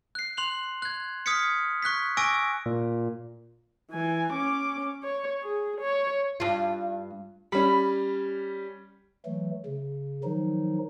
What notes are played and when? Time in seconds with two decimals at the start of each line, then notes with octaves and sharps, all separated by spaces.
0.15 F#6 C7
0.37 C6 F#6 F7 F#7
0.82 F#6 G#6
1.26 D#6 F6 G#6 B6 C#7
1.82 C#6 F#6 G#6 B6
2.17 G#5 C#6 D6 E6 A#6 D7
2.66 A#2
3.91 E3 G#5
4.33 C#4 D6
5.03 C#5
5.43 G#4
5.81 C#5
6.40 G2 F4
7.52 G3 C#4 B5
9.26 E3 F#3 A3
9.65 C#3
10.24 D#3 F3 F#3 D#4